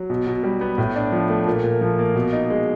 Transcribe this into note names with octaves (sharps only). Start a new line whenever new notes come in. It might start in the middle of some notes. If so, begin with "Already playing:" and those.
Already playing: F#3
B2
B2
G3
B3
A2
D4
F3
A3
A#2
A#2
F3
A#3
B2
D#4
G#3